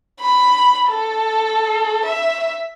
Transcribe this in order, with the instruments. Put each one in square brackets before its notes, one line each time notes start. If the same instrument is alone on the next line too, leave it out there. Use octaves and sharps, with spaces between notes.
[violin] B5
A4
E5